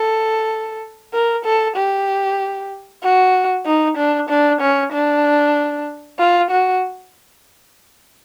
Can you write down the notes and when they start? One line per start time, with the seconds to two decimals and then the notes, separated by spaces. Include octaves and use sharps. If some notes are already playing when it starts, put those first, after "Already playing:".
Already playing: A4
1.13 A#4
1.45 A4
1.76 G4
3.03 F#4
3.65 D#4
3.97 D4
4.29 D4
4.61 C#4
4.92 D4
6.19 F4
6.50 F#4